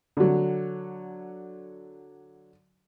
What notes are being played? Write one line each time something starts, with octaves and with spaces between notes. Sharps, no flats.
D3 F#3